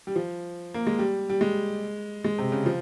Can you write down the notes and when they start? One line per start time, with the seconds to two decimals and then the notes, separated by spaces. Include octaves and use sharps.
0.07 G3
0.16 F3
0.74 A#3
0.87 G#3
0.99 G3
1.29 G3
1.41 G#3
2.24 G#3
2.38 C3
2.52 C#3
2.66 F3